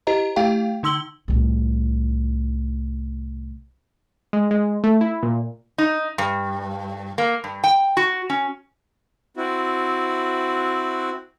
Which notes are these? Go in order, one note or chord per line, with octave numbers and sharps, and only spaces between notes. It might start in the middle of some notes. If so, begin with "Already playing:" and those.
E4 G4 C5 D#5 A#5
A3 E4 G4 F5 G5
D3 D#4 C6 E6 F#7 G7
C2 A2
G#3
G#3
A3
E4
A#2
D#4
G2
A#3
G2
G5
F#4
C#4
C4 E4 F#4